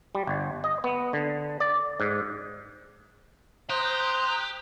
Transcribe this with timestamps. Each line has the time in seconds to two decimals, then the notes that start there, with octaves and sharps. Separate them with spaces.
0.15 G3
0.27 G1
0.64 D#5
0.84 B3
1.13 D3
1.60 D5
2.00 G#2
3.70 G4 C5 A#5 D#6 F#6 G6